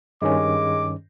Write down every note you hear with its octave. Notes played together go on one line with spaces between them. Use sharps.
G2 D#3 G#3 C#4 D6